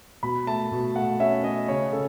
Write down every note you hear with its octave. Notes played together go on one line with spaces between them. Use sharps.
B2 B5
A3 A5
B2
A3 F#5
C#4 E5
C#4 D#5
C#3 C#5
C#3 A4